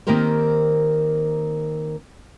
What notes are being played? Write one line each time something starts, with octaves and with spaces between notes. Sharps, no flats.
D#3 A#3 C4 G4 A#4 C5